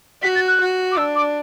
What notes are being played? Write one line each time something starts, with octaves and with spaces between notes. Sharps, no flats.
F#4 B6
A6
F#6
F#4
D6
D4 E6
D6